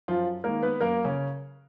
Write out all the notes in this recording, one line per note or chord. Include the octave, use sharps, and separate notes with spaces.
F#2 F3 F4
D#3 G#3 A#3 A#4
B3 B4
F#2 A#3 A#4
C#3 C#4